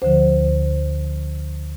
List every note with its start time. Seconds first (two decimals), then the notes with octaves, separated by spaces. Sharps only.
0.02 D2 D3 F3 C5